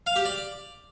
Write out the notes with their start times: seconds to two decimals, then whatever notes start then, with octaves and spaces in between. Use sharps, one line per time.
0.07 F5
0.16 G4
0.25 D5